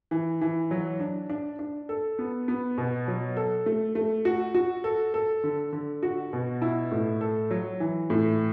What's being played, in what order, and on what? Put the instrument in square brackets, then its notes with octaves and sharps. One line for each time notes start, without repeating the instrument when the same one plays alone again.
[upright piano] E3
E3
F#3
D4
D4
D4
A4
B3
B3
B2
F#3
A4
A3
A3
F#4
F#4
A4
A4
D3
D3
F#4
B2
E4
A2
A4
F#3
E3
A2